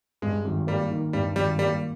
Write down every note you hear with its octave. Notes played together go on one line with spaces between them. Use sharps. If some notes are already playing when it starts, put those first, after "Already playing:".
G2 G#3
G#1
G3 A#3
D#3
G2 G3
G#1 G3
G3 A#3